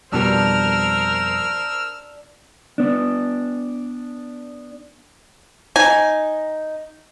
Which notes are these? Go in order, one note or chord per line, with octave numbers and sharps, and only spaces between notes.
F2 B2 G3 D4 A#4 C5 E6 F6
B3 D4
D#4 G#5